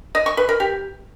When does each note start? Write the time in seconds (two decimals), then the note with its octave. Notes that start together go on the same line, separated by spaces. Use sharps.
0.15 D#5
0.26 C#6
0.37 B4
0.49 A#4
0.60 G4